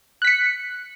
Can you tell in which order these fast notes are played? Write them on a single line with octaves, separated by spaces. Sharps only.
F#6 B6 C#7